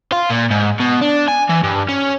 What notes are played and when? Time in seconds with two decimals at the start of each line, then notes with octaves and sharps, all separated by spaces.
0.12 F4
0.30 A#2
0.51 G#2
0.80 B2
1.02 D4
1.28 G#5
1.50 E3
1.63 G2
1.89 C#4